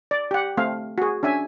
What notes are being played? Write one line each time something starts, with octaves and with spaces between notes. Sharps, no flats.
D5
G4 F#5
A3 C4 F5
F#4 G#4
C#4 D4 E5 G#5